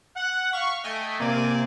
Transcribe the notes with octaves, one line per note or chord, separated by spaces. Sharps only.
F#5
F5 C#6 B6
A3 D#5 G5 G#5
C3 A#3 C4 D5 G#5